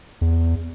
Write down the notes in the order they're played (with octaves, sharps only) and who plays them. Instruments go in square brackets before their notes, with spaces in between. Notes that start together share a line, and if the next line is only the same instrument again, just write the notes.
[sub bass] E2